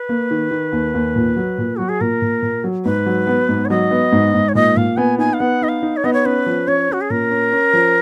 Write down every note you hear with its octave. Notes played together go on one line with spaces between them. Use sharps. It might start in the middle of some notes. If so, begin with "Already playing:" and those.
Already playing: B4
A#3
D#3
D#3
D#2
D#2
A#2
F#3
A#2
F#3 F#4
G#4
A#2 A#4
A#2
A#2
F#3
G#2 B4
F#3
B3
G#2
C#5
F#3 D#5
B3
G#2
G#2
C#5
A#2 D#5
A#2 F5
B3 G#5
D#4 G#5
F5
B3 F#5
D#4 D#5
F5
D#4
C#5
B3 D#5
C#5
C#4 B4
F3
C#4 C#5
C#4 F#4
G#4
A#2 A#4
C#4
C#4
F3